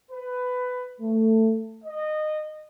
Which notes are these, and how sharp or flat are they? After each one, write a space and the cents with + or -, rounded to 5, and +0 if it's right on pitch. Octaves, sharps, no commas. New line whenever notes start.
B4 +15
A3 +15
D#5 -20